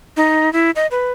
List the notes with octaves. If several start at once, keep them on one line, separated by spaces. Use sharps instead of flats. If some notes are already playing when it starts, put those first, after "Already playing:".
D#4
E4
D#5
B4